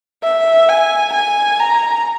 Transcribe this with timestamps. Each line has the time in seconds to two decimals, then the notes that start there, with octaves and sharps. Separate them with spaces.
0.24 E5
0.69 G#5
1.14 G#5
1.60 A#5